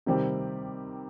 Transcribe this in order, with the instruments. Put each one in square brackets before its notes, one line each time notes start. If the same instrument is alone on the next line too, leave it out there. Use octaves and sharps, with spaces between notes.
[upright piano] C3 D#3 G3 C4 G4